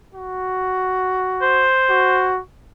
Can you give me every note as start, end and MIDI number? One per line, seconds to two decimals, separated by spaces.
0.15 1.68 66
1.42 2.28 72
1.90 2.40 66